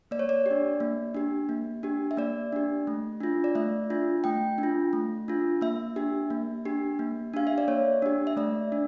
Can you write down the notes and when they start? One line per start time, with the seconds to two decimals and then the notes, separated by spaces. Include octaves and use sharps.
0.11 A#3 D5
0.19 C#5
0.29 D5
0.46 D4 G4
0.80 A#3
1.15 D4 G4
1.49 A#3
1.83 D4 G4
2.11 E5
2.17 A#3 D5
2.52 D4 G4
2.87 A3
3.20 D4 F4
3.44 D5
3.55 A3 E5
3.90 D4 F4
4.24 A3 G5
4.58 D4
4.63 F4
4.93 A3
5.28 D4 F4
5.61 A#3 E5
5.96 D4 G4
6.30 A#3
6.65 D4 G4
6.99 A#3
7.34 D4 G4 F5
7.47 E5
7.58 D5
7.68 A#3 C#5
8.02 D4 G4
8.27 E5
8.37 A3 D5
8.72 D4